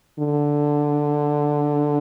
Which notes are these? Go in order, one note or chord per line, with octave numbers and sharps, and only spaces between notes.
D3